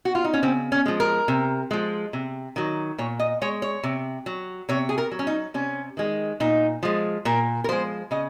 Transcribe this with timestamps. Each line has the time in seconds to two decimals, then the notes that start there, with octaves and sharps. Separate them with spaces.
0.05 F#4
0.15 F4
0.25 D#4
0.33 C#4
0.43 C#3 C4
0.72 C#4
0.86 F3 G#3
1.00 A#4
1.28 C3
1.71 F3 G#3
2.13 C3
2.56 D#3 F#3
2.98 A#2 C#5
3.19 D#5
3.42 G#3 C#5
3.62 C#5
3.83 C3
4.26 F#3
4.69 C3 C#5
4.89 G#4
4.98 A#4
5.11 F#3
5.19 C#4
5.27 D#4
5.54 C3 C#4
5.97 D#3 G#3
6.40 A#2 D#4
6.83 F3 G#3
7.25 A#2 A#4
7.64 A#4
7.69 F3 G#3 C5
8.11 C#3 D#5